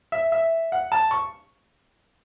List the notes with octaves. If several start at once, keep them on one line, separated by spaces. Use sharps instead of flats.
E5
E5
F#5
A5
C#6